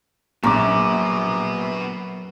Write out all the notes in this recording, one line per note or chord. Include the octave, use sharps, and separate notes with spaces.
A#1 F#2 B3 F#4 A#5 D6